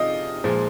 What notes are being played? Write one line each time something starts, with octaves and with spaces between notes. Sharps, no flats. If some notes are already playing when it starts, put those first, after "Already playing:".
Already playing: C3 F3 G#3 D#5 F5
A#2 F3 G#3